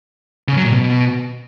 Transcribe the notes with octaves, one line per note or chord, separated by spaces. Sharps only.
C#3
F#3
A#2
B2